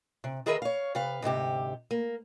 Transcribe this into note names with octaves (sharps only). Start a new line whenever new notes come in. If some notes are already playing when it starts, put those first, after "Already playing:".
C3
D#3 G#4 A#4 B4 D#5 E5
C#5 F5
C3 B4 F5
D2 G#2 C3 G4
A#3